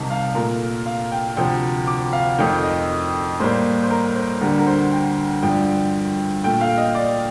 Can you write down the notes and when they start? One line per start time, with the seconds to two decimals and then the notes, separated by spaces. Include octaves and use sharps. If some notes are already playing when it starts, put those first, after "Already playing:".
Already playing: C2 C3 D#3 A5
0.10 F5
0.35 A#2 A3 A#4
0.86 F5
1.12 G5
1.37 D2 C3 F3 G5
1.87 D6
2.13 F5
2.38 F2 D#3 A3 G5
2.63 D#5
3.40 A2 G3 A#3 C5
3.83 C5
3.90 A#4
4.16 C5
4.41 D2 D3 G3 A#4
4.59 A#4
4.67 C5
4.92 G5
5.42 G2 D3 F3 G5
6.44 A#2 A3 G5
6.61 F5
6.78 D#5
6.95 D5